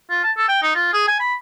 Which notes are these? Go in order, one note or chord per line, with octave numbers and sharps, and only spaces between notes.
F4
A5
A4
G5
D#4
F4
G#4
G#5
B5